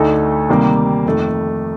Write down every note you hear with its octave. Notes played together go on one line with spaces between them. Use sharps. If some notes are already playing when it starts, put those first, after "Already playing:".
Already playing: D2 D3 A3 D#4 A4
C3 D#3 G3 A#3
F2 D#3 A3